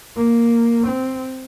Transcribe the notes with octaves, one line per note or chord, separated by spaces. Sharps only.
A#3
C4